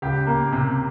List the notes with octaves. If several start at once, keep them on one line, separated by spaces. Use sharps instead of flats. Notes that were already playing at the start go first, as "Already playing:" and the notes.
C#2 G4
A#3
C3